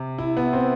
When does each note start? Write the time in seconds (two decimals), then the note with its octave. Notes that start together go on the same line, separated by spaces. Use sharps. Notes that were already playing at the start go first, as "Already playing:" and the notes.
Already playing: C3
0.19 E4
0.37 B3
0.53 C4